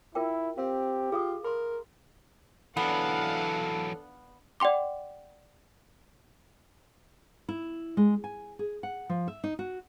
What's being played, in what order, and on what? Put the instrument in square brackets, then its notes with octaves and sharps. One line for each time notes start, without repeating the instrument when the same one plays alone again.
[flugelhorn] E4 [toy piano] F4 A#4 G5
[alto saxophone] C4 [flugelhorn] G4 [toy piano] F5
[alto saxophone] F4 [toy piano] G#4 F5 D#6
[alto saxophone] A#4 [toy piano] B5 C6
[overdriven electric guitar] E3 F#3 [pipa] B3 [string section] D4 F5 F#5 [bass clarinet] A4
[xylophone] D5 F#5 G5 C6 D6
[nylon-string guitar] E4
G#3
G#5
G#4
F#5
F3
E5
D#4
F#4